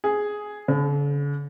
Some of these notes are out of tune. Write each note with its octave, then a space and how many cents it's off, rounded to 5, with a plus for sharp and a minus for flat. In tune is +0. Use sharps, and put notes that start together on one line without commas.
G#4 +5
D3 -45